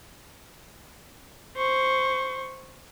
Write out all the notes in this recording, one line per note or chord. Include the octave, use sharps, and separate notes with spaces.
C5 C#6